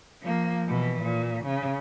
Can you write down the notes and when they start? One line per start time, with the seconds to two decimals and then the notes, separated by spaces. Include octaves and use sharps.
0.22 F3 A#3
0.68 B2 E3
1.02 A#2
1.44 C#3